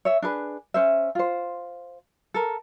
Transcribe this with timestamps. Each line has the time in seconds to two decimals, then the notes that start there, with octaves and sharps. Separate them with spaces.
0.05 C#5 E5
0.22 D4 G#4 B4
0.74 C#4 C5 E5
1.15 F4 C5
2.34 A4 A#4